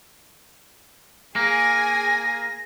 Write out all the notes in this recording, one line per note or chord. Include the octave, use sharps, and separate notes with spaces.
A#3 G#4 G#5 A#6